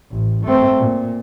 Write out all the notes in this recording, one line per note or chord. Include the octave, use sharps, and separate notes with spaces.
A1
A3 C4
A#2